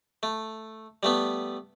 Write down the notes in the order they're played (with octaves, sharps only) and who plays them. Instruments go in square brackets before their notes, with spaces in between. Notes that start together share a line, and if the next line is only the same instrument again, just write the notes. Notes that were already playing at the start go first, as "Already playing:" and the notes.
[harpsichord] A3
G3 A3 B3